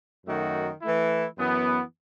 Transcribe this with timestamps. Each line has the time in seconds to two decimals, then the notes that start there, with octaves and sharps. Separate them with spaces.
0.26 F#2 D#3 A3 D#4 F#4
0.82 E3 A3 E4
1.37 F#2 E3 B3